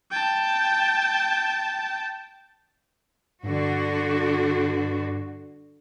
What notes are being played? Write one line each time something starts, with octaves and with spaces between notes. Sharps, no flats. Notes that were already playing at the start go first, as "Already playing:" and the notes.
G5 A5
G2 D3 F#4